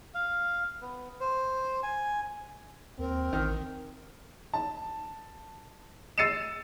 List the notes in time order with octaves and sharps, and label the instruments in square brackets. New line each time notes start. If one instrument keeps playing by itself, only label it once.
[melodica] F5
B3
C5
G#5
[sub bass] D#2 [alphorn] C4 [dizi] A#4
[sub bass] A1 [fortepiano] D#3 F6
[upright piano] A5
E6 A6 C7 C#7 D#7 E7